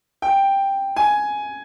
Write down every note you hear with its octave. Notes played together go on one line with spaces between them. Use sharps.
G5
G#5